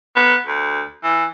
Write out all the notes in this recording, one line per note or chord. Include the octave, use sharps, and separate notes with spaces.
B3
D2
E3